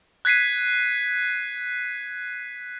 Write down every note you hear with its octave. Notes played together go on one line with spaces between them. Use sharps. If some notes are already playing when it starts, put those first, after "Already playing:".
F#6 G#6 B6 C7 D#7